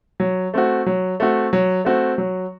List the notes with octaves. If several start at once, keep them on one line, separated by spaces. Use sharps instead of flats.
F#3
A3 C4 F#4
F#3
A3 C4 F#4
F#3
A3 C4 F#4
F#3